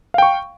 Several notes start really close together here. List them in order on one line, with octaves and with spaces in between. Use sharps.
F5 G5 C#6